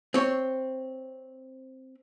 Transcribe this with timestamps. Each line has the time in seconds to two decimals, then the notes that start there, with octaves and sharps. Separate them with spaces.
0.14 C4 C#5